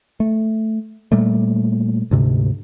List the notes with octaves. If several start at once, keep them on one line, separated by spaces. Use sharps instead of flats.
A3
A#2 G3 A3
D2 G#2 C3